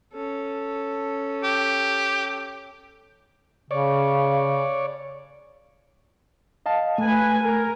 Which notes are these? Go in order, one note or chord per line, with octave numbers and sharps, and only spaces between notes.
C#4 A4
G4
C#3 C#5 D5
D#5 F5 A5
A3 B4 G#5
A#4